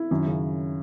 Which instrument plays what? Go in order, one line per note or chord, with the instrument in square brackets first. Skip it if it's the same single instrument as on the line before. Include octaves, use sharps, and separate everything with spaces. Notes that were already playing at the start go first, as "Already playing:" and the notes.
Already playing: [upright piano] E4
[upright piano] F#2 [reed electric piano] D#3
[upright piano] C#3